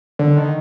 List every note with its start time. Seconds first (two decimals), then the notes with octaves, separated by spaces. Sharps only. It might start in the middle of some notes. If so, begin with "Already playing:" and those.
0.19 D3
0.37 D#3